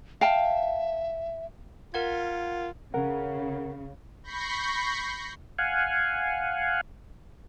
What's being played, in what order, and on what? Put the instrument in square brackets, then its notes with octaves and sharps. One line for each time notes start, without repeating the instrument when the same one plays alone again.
[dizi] E5 [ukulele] F5 G5 A5
[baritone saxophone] F4 [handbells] A#4 F#5 G#6
[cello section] C#3 [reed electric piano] A#4 F#5
[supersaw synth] B5 C#6 G6 A#6 C7
[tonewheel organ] F5 F#5 G#5